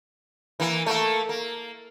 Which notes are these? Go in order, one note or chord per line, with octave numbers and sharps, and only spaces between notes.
E3 A#3
A3 A#3
A#3